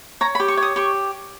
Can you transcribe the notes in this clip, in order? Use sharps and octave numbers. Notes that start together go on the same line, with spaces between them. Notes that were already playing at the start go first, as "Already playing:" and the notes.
C#5 A#5
B5
G4
C#6
C#5
D#6
G4 C#6